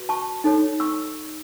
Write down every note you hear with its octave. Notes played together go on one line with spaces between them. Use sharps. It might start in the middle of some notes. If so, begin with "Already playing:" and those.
Already playing: F#4 B4
A5 C#6
D#4 A4 C#5
C#6 E6